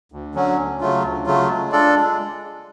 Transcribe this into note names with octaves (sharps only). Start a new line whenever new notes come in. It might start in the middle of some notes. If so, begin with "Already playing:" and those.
D2
D3 F#3 C#4
D2
C#3 F#3 A3 F4
D2
C#3 F#3 A3 F4
G#3
D4 F4 A4 D5
G#3